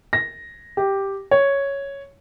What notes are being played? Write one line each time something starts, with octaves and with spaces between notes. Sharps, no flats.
A#6
G4
C#5